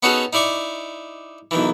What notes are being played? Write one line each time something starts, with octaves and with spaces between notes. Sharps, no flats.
B3 C#4 D#4 F#4 G#4 A4
D#4 E4 D5 C#6 D6
B1 D#3 E3